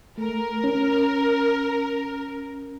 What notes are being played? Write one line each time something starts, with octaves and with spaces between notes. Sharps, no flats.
A3 A#4
C#4